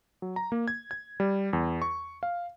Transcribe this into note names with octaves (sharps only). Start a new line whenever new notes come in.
F#3
A#5
A#3
G#6
G#6
G3
E2
C#6
F5